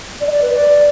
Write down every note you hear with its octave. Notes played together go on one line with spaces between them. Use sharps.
D5
D#5
D5
B4
D5